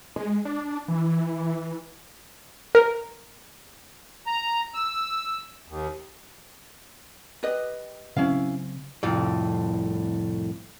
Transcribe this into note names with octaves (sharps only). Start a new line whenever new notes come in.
G#3
D4
E3
A#4
A#5
E6
D#2
G4 B4 D#5
C#3 F#3 C4 C#4 E4 F5
C2 F2 A2